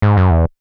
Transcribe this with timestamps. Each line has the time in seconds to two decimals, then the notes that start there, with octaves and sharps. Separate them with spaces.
0.02 G#2
0.17 F#2
0.31 E2